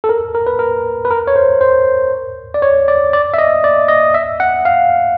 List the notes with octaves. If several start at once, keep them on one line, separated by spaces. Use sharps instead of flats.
A4
A#4
A#4
B4
A#4
B4
A#4
C#5
C5
C5
D5
C#5
D5
D5
E5
D#5
D5
D#5
E5
F#5
F5